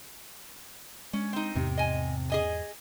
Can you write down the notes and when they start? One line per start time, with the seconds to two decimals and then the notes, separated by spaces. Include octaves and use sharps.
1.13 G#3 C#4
1.33 C4 D#4
1.55 E2 G#2 C3
1.78 D#5 G#5
2.30 G#4 D#5 G#5